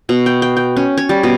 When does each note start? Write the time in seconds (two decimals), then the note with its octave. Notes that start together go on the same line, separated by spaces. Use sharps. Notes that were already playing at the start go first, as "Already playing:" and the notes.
0.09 B2
0.26 G5
0.42 G5
0.57 G5
0.76 C#4
0.98 C#5
1.09 G3
1.23 B2